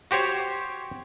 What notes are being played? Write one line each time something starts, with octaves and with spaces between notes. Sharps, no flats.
F#4 G4 C5 C#5